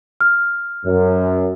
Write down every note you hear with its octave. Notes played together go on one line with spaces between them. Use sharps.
F6
F#2